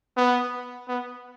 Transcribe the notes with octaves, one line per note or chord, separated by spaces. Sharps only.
B3
B3